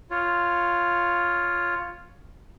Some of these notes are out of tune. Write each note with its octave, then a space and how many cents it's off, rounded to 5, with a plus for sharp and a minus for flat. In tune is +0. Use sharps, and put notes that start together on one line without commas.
F4 +0 C#5 +0